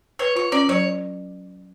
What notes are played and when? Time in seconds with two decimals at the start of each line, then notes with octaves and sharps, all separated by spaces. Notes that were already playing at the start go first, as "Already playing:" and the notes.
0.19 B4 C#5
0.36 F4 C#5
0.52 C#4 D5
0.69 F#3 C#5